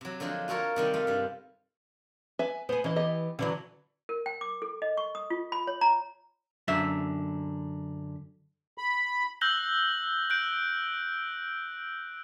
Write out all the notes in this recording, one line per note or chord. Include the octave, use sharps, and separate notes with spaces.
C3 F#3
D3 F3 F#3 G#3 G#4
F4 F#4 A4 A#4 C#5
C3 D#3 G3
A3 F4 D#5 F5
G2 G3
B4 E5 G#5
B3 G#4 C5
E3 C#4 D#5
B3 G4 D#5
D3 E3 F#3 C#4
A#4
G5
D6
A4
D#5
C#6
D#6
F4
B5
C#5
A#5
F#2 D3 E5
B5
E6 F#6 G6 A#6 F#7 G7
F#6 G6 D7